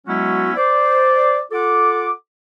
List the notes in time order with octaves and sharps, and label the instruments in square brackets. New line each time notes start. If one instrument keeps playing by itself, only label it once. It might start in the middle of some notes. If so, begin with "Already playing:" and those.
[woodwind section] F#3 G#3 B3 C#4 E4 F#4
C5 D5
F4 A4 F#5 D6